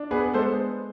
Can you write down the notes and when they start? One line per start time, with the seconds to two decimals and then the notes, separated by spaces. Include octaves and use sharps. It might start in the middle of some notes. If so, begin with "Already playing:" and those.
Already playing: D4
0.11 B3 G#4 B4
0.34 G#3 A4 C5